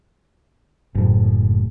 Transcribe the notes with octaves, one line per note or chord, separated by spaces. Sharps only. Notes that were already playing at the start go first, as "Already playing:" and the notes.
F#1 A2